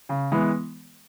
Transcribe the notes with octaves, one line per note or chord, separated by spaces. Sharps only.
C#3
E3 G#3 B3 E4